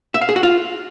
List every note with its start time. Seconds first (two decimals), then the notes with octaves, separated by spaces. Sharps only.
0.14 E5
0.21 F5
0.29 G#4
0.36 F#4
0.43 F4